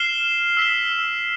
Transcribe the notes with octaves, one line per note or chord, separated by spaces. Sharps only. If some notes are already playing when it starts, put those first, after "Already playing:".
Already playing: F6 C7 E7 G7
E6 B6 E7 G7